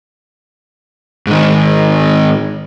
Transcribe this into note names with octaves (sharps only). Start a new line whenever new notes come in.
G#2 D#3